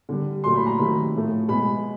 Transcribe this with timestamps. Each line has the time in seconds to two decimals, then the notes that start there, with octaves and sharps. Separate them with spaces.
0.09 D3 G3
0.44 A#2 F#3 A3 C6
0.56 B5
0.66 A#5
0.78 C3 D#3 F#3 A3 B5
1.15 A2 F3 A3
1.49 B2 G#3 B5